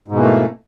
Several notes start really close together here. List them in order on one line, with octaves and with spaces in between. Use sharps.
G#2 B2 E3 A#3 A3